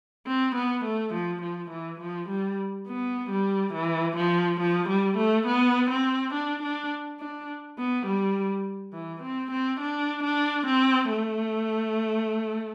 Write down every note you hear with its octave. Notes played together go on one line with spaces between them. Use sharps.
C4
B3
A3
F3
F3
E3
F3
G3
B3
G3
E3
F3
F3
G3
A3
B3
C4
D4
D4
D4
B3
G3
E3
C4
C4
D4
D4
C4
A3